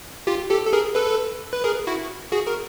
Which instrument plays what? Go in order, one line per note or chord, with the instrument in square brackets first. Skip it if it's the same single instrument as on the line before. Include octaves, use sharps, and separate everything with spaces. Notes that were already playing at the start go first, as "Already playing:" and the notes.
[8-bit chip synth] F4 G4
G4 A4
A4
G#4 A#4
A4 B4
B4
G#4 A#4
E4 F#4
F#4 G#4
A#4